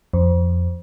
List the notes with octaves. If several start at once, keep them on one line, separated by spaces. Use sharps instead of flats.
F2